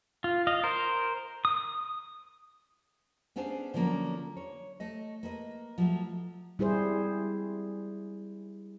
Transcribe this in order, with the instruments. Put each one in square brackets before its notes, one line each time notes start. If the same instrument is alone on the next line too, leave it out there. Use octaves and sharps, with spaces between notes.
[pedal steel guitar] F4
D#5 F5
A#4 C5
D#6
[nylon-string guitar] B3 C#4 D4 G#4 C5 F5
D3 F3 F#3 A#3 C#4
C#5
A3 D#5
A#3 B4 D#5
F3 F#3 A3
[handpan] G3 E4 G#4 C5